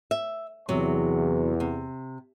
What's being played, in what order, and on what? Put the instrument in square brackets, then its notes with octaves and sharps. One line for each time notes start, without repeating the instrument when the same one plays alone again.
[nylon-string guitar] E5
[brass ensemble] E2 [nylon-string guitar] C3 F#3
[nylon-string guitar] C3